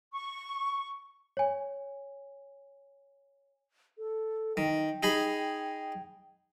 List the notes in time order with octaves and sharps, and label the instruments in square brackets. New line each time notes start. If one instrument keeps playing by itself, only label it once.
[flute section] C#6
[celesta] C#5 G#5
[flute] A4
[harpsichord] D#3 [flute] G5
[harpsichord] D#4 G#4 B5